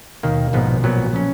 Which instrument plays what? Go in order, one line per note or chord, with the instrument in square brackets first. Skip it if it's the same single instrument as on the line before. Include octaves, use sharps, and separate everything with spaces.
[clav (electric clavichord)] D#2 D#3 A#3 [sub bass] B2
[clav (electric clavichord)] A#1 G#2 F3 B3 D#4
A#1 A#2 F#3 B3
[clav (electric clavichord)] C#3 F#3 C#4 [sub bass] F3